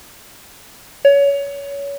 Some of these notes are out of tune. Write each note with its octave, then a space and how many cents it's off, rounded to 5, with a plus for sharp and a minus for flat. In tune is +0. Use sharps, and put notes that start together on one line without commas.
C#5 +25